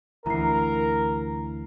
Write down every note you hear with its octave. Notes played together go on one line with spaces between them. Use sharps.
D2 E3 A#4 A#5 C7